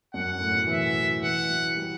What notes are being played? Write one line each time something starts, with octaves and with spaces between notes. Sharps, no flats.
F#2 F#5
A2
B2
E3 E5
E3 F#5
F#3
G3